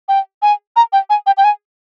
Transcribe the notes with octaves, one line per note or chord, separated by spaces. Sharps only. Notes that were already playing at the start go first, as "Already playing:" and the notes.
G5
G#5
A#5
G5
G#5
G5
G5
G#5